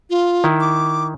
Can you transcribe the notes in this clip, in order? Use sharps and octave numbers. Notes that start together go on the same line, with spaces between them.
F4
D#3 E4
D6